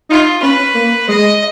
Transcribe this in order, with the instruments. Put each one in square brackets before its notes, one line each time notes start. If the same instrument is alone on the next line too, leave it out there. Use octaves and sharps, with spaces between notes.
[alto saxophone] D#4 [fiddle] F4
[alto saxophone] C#4 [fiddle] B4
[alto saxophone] A#3
[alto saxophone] G#3 [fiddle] D#5